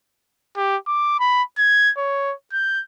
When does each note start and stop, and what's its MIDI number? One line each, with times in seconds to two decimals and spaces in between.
0.57 0.77 67
0.87 1.17 86
1.20 1.43 83
1.58 1.91 92
1.97 2.34 73
2.53 2.82 91